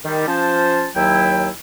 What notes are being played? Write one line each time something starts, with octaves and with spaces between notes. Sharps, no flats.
D#3 G3
F3 C#4 C5 A5
D#2 F#3 E4 G5